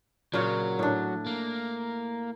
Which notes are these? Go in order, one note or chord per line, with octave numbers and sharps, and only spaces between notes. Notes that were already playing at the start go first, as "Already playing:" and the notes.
A#2 C#3 F#3 C#5
A2 D4
A#3